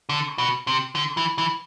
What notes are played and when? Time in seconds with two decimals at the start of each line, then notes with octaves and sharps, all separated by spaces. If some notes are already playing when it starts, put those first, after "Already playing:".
0.09 D3
0.38 B2
0.67 C3
0.95 D3
1.17 E3
1.38 E3